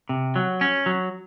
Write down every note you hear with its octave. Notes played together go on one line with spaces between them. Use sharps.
C3
F#3
C#4
F#3